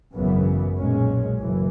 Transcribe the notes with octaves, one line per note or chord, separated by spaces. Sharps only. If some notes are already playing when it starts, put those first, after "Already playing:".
G#1 F#2 C#3 E3 B3
B1 A#2 G#3 C#4
F#1 F#2 E3